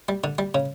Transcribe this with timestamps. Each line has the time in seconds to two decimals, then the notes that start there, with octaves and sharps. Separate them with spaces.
0.09 G3
0.24 D3
0.38 G3
0.54 C#3